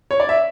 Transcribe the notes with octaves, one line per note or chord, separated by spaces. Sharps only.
C#5
D5
E5